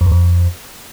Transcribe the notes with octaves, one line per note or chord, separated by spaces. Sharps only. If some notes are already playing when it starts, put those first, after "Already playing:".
F2
E2
F2